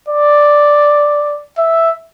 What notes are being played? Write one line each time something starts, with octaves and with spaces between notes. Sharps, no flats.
D5
E5